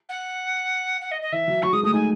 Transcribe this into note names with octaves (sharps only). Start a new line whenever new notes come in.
F#5
F#5
D#5
D#5
E3 E5
F#3
F#3 C#6
G#3 D#6
A3 D#6
D#4 G#5